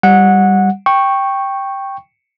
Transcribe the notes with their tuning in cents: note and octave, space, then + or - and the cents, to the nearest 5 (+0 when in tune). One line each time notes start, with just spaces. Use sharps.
G3 +0 F#5 -15
G5 +0 C#6 -10